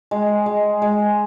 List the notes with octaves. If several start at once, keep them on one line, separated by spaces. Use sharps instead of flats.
G#3
G#3
G#3